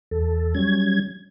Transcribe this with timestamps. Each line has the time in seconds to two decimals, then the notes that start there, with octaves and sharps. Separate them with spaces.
0.11 E2 A4
0.55 F#3 G3 C#4 G#6